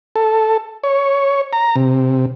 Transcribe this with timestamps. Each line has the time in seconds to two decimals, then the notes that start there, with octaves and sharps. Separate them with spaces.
0.16 A4
0.84 C#5
1.53 A#5
1.76 C3